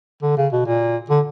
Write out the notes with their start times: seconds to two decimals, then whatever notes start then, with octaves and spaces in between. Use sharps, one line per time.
0.22 D3
0.37 C#3
0.52 B2
0.66 A#2
1.10 D3